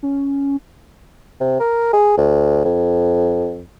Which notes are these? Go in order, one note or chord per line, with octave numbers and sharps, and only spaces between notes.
C#4
C3
A#4
G#4
D2
F2